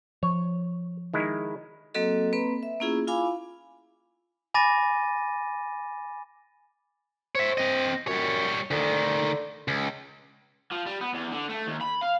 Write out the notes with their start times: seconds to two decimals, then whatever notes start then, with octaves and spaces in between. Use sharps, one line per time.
0.23 F3 C#5
1.14 D#3 G#3 E4
1.94 F#3 A#3 C4 F#4 A4 D#5
2.33 A#3 C4 B4 B5
2.63 E5
2.80 A#3 B3 C#4 E4 F4 G#4
3.07 E4 F4 F5 G#5 B5 D6
4.54 G#5 B5 D6 A6 A#6 D#7
7.35 C5 C#5 E5
7.58 C4 D#5
8.07 F#2 G3 C#5
8.71 D2 D3 D#3
9.68 C#2
10.72 F3
10.87 G3
11.01 B3
11.14 E2
11.32 D3
11.49 A3
11.67 D#2
11.82 B5
12.02 F5